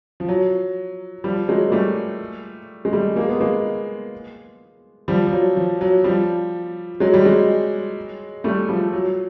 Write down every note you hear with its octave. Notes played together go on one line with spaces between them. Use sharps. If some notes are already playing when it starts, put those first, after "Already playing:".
F3
F#3
F3 G3
F#3 G#3
A#3
G3 A3
G#3
G3 A3
G#3 A#3
B3
G#3 A#3
F3 G3
F3
F#3
F3
F#3
F3 G3
F#3 G#3
G3
F#3 G#3
G3 A3
F3 G3
F#3